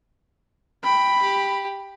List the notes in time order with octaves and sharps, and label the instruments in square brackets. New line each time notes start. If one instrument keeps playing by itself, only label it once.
[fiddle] G5 [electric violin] B5
[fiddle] G4